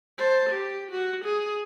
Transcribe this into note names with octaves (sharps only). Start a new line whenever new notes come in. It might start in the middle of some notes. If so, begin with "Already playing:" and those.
C5 A5
G4
F#4
G#4